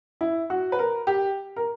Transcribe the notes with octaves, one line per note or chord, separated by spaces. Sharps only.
E4
F#4
B4
A#4
G4
A#4